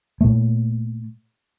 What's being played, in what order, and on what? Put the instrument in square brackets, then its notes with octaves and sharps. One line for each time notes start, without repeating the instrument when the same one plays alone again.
[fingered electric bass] A#2 A3